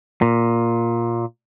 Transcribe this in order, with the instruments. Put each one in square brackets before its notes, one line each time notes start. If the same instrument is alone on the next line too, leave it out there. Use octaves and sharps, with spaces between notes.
[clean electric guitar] A#2